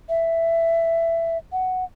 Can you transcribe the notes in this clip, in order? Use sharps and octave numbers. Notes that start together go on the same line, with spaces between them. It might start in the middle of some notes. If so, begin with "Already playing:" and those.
E5
F#5